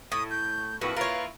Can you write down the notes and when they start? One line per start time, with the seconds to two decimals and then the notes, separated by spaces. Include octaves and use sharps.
0.12 A2 D#6
0.31 G6
0.81 F2 A2 A#3 F#4 B4
0.96 A#3 E4 F4 A#4 C#5